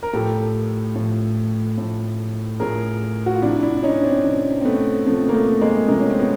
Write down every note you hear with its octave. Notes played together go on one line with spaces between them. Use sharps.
A#4
A2 F3 G4 A4
A2 F3
A2 F3
A2 F3 G#4 A#4
F#4
F4
C3 F3 D4 E4
D4 E4
D4
C#4 D#4
C4 D4
C3 F3
C4
A3 B3
C3 F3 A3
A#3
A3
G#3 A#3
C3 F3 G#3 A#3
C#4
C4
B3